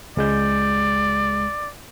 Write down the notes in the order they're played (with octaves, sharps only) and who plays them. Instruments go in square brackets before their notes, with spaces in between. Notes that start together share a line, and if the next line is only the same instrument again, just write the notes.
[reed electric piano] C#2 G#3 G6 [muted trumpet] D5